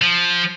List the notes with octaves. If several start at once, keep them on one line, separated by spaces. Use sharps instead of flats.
F3